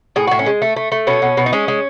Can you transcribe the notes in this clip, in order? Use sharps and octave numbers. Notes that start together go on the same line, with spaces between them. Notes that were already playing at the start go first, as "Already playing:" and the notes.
A2 G#4
A2 F#4
C#4
G#3
A3
A3
A3
B2 C#4
B2
B2
D#4
G#3 C#4
G#3